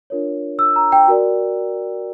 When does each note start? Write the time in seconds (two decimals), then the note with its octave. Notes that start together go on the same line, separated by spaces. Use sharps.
0.10 D4 F4 A#4 C#5
0.59 E6
0.76 A#5
0.92 G5
1.08 F#4 A#4 D5